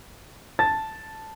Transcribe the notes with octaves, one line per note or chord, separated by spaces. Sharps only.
A5 A6